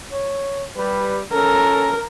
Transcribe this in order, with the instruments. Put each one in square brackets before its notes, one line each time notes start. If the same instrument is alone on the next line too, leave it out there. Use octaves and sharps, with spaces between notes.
[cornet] C#5
[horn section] G3 [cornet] B4
[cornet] C#4 [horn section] A4 [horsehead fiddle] A#4